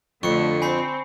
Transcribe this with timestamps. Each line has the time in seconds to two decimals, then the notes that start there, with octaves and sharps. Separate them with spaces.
0.23 F2 D3 A3 C#6 C#7
0.62 C4 G#5 B5 C7